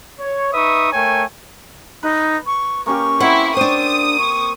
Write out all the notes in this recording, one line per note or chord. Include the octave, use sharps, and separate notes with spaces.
C#5
D#4 B4 E5 C#6 D#6
A3 A#4 C#5 G5 G#5
D#4 B4
C#6
A#3 C#4 G4 C#6
C4 E4 F#5
D4 C5 D#6
C#6